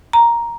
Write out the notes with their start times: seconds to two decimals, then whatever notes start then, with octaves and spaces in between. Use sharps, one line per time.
0.13 A#5